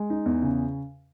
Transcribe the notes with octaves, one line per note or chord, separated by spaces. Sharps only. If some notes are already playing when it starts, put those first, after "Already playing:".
Already playing: G#3
D#4
E2
C#3